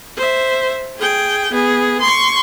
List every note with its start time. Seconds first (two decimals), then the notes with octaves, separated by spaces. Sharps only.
0.16 C5 E5
0.98 G#4 G5
1.51 B3 G#4
2.00 C6 C#6